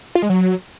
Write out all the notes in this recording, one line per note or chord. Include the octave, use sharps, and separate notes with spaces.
F4
G#3
F#3